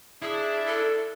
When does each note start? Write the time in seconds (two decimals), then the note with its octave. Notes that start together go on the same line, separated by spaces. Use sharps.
0.22 D4 E4 G#4
0.67 A4